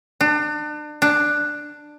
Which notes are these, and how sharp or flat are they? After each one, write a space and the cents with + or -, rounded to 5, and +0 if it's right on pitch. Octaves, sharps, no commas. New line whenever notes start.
D4 +35
D4 +10